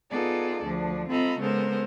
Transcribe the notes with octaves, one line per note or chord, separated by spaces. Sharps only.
B3 D#4 F4 G#4 A4 D5
D2 F3 D4
C4 F4 A4 D#5 A#5 B5
C#3 G#3 B3 A4 A#4 C5